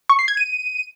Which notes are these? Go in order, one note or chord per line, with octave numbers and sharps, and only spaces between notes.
C#6
C7
G#6
D#7